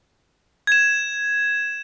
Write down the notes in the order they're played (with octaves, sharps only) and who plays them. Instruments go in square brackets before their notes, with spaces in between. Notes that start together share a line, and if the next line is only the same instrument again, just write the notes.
[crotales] G#6 E7